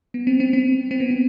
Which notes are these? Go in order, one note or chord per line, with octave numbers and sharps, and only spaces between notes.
B3
C4
C4
C4
C4
B3
C4